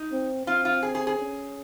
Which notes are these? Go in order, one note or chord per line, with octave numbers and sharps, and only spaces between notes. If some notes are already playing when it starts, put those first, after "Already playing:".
Already playing: D#4
C4
C4 F4
F4
G#4
G#4
G#4
C#4